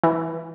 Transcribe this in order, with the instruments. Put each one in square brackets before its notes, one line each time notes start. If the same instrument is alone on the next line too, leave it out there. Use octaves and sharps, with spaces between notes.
[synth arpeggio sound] E3